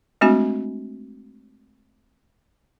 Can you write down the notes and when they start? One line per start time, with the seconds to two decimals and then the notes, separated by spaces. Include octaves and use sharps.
0.21 G#3 A3 C4 D4 F#4 G#5